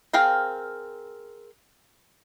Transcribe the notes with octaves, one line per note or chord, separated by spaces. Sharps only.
C4 G#4 A#4 F5 G5